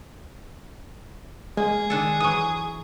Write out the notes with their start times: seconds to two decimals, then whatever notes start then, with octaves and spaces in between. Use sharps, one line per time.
1.57 G#3 A#3 G#4
1.90 D#3 D4 A4
2.20 E3 F#3 C#6 D#6